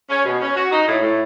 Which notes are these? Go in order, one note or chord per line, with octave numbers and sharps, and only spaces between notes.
C#4
B2
C#4
F#4
D#4
A2
A2